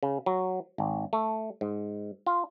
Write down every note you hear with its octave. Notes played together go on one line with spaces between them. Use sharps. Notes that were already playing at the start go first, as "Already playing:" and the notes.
C#3
F#3
G#1
A3
G#2
F4